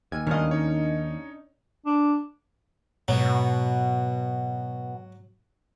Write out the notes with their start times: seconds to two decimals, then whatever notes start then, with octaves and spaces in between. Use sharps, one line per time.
0.12 D#2 G#5
0.27 D2 G2 D#3 C#4 D4 D#5 F5
0.51 D#4 C#5
1.86 D4
3.08 G#2 B2 F#3